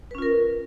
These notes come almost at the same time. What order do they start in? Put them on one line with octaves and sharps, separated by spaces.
B4 C#4 F4 A#4